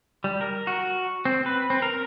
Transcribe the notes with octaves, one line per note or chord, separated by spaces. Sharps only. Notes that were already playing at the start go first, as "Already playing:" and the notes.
G3
A#4
F#4
C4
B4
C4
A#4